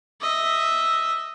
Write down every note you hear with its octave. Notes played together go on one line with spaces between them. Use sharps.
D#5 E5